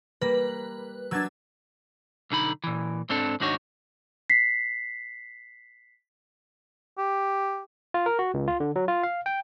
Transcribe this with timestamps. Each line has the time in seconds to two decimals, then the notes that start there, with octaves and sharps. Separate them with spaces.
0.21 G3 A#3 B4 A#6
1.11 F#3 D4 E6 G#6 A6
2.31 B1 D3 D#4 B5
2.64 A#2 E3
3.09 G#2 C4 D4 A4
3.40 D#2 G#2 D4 D#4 F#4 C#5
4.30 B6 C7
6.98 G4
7.94 F4
8.06 A#4
8.19 F#4
8.34 C#2
8.48 F4
8.60 D3
8.76 F#3
8.88 F4
9.03 F5
9.26 G5